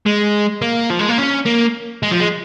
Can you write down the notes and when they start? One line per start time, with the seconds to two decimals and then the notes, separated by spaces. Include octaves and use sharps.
0.06 G#3
0.62 A#3
0.90 F3
0.99 G#3
1.09 A#3
1.18 C#4
1.46 A#3
2.03 G#3
2.11 F3
2.20 G#3